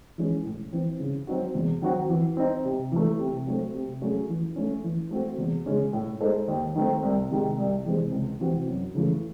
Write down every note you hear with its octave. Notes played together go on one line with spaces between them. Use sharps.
E3 G#3 C#4
A2
E3 C4
C#3
F#3 C4 D#4 F#4
E2
D#3 F#3 C4 F#4
E3
C4 D#4
C3
E3 A3
C3
F#3 A3 C4
C3
F#3 A3 C#4 G#4
E3
A3 C#4
E3
A3 C4 F#4
E2
C#3 G#3 C#4
A2
G#3 D#4 A4 C5
D#2
D#3 A3 C4
C2
C3 D#3 G#3 D#4
C2
C3 E3 G#3 C4
C#2
C3 E3 C4 F#4
F#2
C#3 E3 A3